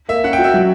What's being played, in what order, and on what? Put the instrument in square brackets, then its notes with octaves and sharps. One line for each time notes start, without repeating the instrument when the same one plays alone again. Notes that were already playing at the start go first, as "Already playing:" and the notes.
[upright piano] A#3 [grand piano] E5
[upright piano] C#4 [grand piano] F#5
[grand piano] G5
[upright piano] F#4
[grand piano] E5
[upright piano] F#3